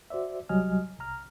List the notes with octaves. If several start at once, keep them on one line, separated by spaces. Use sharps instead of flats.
F#4 C5 D5 E5
C2 F#3 G3 D#5 G#5 F6
C2 A#5 F6